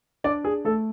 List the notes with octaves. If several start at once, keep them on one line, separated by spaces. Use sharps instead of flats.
D4 D5
G#4
A3 A4